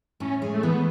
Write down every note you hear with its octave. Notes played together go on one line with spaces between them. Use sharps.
A2 C#4
G#3
A3
E3 B3